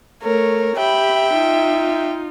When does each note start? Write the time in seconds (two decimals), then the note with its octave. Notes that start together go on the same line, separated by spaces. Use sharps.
0.23 A3 A#4 C#5
0.76 G4 E5 G5 B5
1.34 D#4 F4